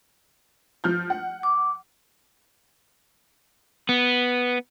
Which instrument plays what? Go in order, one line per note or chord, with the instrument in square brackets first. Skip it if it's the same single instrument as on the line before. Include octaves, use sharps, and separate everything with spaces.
[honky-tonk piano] F3 F6 G6
F#5
[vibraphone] D6
[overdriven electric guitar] B3